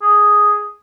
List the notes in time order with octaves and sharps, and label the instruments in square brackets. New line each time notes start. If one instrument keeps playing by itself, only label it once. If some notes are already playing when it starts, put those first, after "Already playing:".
[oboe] G#4